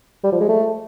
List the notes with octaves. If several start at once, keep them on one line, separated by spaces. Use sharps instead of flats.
G3
F3
G#3
A3